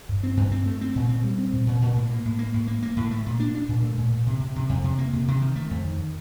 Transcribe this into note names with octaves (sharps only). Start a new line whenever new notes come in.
G2
C4
G2
C4
A3
C4
A#2
C4
G3
C4
A#2
A#2
A#2
A2
A#3
A2
A#3
A2
A#3
A#3
A2
A3
A#2
D4
D4
A#2
A3
A#2
A#2
C3
C3
C3
F2
C3
A#3
C3
C3
D#3
A3
F2
D#3